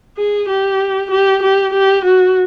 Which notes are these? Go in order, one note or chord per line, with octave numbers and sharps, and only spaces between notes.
G#4
G4
G4
G4
G4
F#4